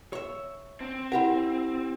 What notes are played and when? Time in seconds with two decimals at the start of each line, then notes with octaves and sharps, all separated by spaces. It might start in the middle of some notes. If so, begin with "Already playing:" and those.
0.13 C#5 E5
0.80 C4
1.12 E4 G4 A#4 F#5